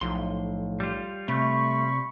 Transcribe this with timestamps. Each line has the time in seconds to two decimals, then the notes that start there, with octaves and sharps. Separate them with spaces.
0.01 B1 A2 F3 C6
0.80 G3 F4
1.28 C3 A3 B5 C#6